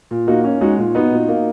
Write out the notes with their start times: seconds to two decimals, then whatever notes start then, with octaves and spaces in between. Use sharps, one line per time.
0.11 A#2
0.27 A#3 D#4 F#4
0.44 C#4
0.61 G#3 D#4 F#4
0.78 A#2
0.95 B3 D#4 F#4
1.12 A#2
1.28 A#3